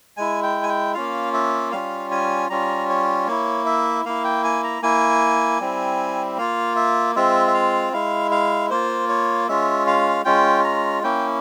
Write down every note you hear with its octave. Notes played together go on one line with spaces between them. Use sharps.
G#3 E4 G#5
G5
G#5
G5
A#3 C#4 F4 F5
E5
G3 C#4 F4 F5
G#5
G3 C#4 F4 A#5
C#5
A#3 E4 C#5
E5
A#3 E4 F5
G5
G#5
A#5
A#3 E4 G#5
G3 C4 E4
A#3 F4 F5
E5
G#3 C4 F4 E5
E5
F5
G#3 E4 F5
F5
A#3 F4 C5
C#5
G#3 C#4 F4 E5
F5
G#3 C#4 F4 G5
A#5
A#3 C#4 E4 G5